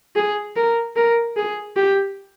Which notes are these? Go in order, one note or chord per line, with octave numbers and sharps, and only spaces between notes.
G#4
A#4
A#4
G#4
G4